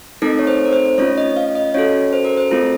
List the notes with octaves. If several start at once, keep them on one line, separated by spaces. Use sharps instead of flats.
A3 C4 D#4 A4 A#4
C#5
C5
A#4
C5
A3 C#4 F4 C#5
D#5
F5
D#5
C#4 F#4 A4 C#5
C5
A#4
C5
A3 C4 F4 A4 A#4